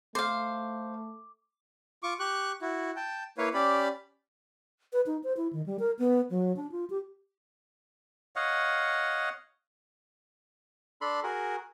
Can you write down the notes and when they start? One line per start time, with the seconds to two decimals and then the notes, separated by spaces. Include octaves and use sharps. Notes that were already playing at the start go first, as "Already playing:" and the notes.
0.15 A3 C5 F5 D6
2.03 F4 C#6 D6
2.20 G4 C#6 F#6
2.62 E4 F#4
2.96 G5 A5
3.38 A#3 E4 B4 C#5 F5
3.54 C#4 G4 D5 B5
4.93 B4
5.06 D#4
5.24 C5
5.37 E4
5.53 D#3
5.66 G3
5.79 A#4
5.99 B3
6.30 F#3
6.57 D4
6.72 F4
6.90 G4
8.36 C#5 D#5 F5 F#5
11.01 D4 A4 B5 C6
11.24 F#4 G#4 A#4